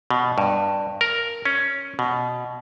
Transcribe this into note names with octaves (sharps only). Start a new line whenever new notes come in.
B2
G2
A#4
C#4
B2